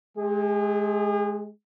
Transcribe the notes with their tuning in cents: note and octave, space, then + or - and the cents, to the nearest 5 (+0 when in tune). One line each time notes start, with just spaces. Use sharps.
G#3 +25 G#4 -40